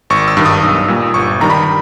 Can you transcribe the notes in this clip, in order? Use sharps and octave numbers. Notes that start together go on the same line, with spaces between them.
G#1 C#6
E6
G2 D#3
D#6
B1
A#2 G3
G1 C#6
G2 D#3 G3 A#5
B5